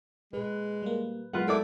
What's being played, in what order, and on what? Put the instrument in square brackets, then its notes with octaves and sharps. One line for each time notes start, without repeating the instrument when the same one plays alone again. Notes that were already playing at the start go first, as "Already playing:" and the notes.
[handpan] A#2 B4 [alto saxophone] G#3
[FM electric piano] G3 A#3
[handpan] F#3 B3 E4 [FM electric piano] G#3 [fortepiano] F4 B4 F#5
[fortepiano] A3 D5 D6 [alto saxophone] E4 [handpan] C5